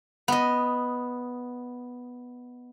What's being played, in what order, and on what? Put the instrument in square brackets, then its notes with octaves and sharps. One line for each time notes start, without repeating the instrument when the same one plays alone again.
[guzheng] B3 D#5